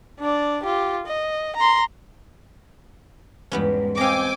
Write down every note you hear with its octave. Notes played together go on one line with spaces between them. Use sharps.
D4 D5
F4 G4
D#5
A#5 C6
E2 G#2 G3 B3 C#4
C4 D#5 F5 G5 G#5 D6